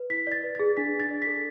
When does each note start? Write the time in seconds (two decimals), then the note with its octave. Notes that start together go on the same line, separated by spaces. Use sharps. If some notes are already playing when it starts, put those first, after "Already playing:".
Already playing: B4
0.10 E4 B6
0.27 D5 A6
0.44 B4
0.55 G#4 A6
0.77 D4 B6
0.94 D4
1.00 A6
1.11 D5
1.22 B6
1.27 A4